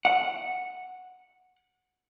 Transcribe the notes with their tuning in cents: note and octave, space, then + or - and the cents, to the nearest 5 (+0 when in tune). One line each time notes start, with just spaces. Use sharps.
F#5 -10